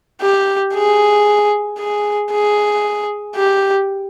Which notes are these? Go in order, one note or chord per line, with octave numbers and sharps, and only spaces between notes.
G4
G#4
G#4
G#4
G4